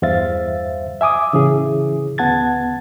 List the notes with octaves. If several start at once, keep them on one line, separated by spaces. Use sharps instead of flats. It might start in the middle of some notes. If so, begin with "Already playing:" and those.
E2 G2 C5 E5 F5 A6
E5 G#5 D6 D#6
A2 C#3 E3 C#4 G#4
D2 B3 F#5 A5 G#6 A6